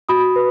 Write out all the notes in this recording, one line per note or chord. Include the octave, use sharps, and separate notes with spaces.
F#4 B5 D#6
B4